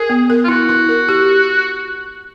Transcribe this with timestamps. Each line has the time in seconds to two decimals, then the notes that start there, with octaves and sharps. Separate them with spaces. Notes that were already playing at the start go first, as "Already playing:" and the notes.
Already playing: G#4 A#4
0.10 B3
0.30 A#4
0.44 F4
0.48 E4 F#4
0.69 E4
0.89 A#4
1.09 G4